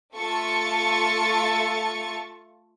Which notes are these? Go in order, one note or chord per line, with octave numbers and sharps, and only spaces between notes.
A3 F4 A4 C#6 A6 C#7